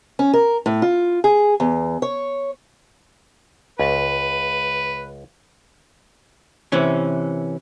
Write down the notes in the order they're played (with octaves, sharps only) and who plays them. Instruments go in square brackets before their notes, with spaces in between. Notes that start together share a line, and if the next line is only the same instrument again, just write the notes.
[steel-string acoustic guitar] C#4
A#4
A2
F4
G#4
E2
C#5
[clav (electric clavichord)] C#2 [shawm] B4
[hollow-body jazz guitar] C3 E3 C#4